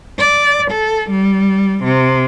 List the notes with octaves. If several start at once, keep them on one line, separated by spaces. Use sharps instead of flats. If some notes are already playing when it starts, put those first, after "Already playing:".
D5
A4
G3
C3